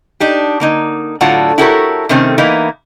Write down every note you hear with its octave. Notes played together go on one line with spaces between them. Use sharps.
D4 D#4 G4
D3 A#3 D#4
A2 D3 F#3 F4 F#5 A5
E4 F#4 G4 A4 A#4 C#5
C3 D#3 A3 C4 C#4
E3 A#3 B3 D#4 E4